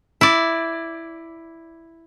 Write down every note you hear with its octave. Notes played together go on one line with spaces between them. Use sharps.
E4 D5